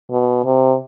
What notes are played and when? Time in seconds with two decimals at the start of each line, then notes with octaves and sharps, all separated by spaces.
0.11 B2
0.45 C3